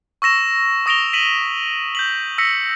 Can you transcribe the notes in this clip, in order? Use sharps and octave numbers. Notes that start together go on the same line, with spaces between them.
C#6 E6 A#6 E7
C#6 D#6 A#6 D7 F7 G7
B6 D#7 E7 F#7
G6 B6 F#7
E6 A#6 B6 C#7